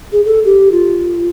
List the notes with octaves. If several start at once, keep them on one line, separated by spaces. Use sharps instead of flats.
G#4
A4
G4
F4